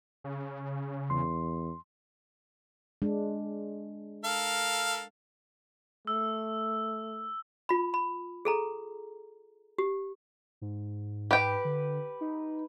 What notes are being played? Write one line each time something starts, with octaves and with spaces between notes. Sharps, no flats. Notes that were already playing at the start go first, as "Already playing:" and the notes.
C#3
E2 C6
G#3 D4
A4 A#4 F5
A3 E6
F4 B5
B5
G#4 A4 A#5
G4
G#2
G4 B4 G5
D3
D#4